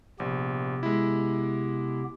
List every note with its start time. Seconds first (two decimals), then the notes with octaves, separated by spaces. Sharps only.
0.20 A#1 C3 B3 G4
0.83 G#3 E4